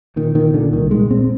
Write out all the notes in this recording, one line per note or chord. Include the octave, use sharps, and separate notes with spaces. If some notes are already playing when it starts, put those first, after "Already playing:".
A#2 D#3
A#2 D#3
A#2 D3
C2 D#3
A#2 G#3
A#2 C4